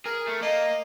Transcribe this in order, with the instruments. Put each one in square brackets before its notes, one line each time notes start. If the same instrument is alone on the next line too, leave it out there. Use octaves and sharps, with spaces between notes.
[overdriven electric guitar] G#4 [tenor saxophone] A#4
[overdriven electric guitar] A3
[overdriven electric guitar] A#3 [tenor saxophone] D#5